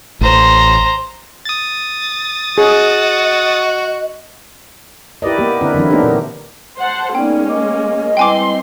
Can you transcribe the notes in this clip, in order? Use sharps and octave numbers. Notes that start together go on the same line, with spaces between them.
A1 C5 A#5
D#6 A6
F#4 G#4 D#5
E4 G4 A#4 B4 D5 D#5
A#3 B3 G4
D3 C4 D4 E4 A#4 B4
D3 E3 F#3 C4 E4
A#3 B3 D4 D#4 G4 A#4
A#2
C5 F#5 A5
G#3 A#3 B3 C#4 D#4 D5 G5
D#5 D6
G3 C4 E4 B4 G5 G#5 C6 D6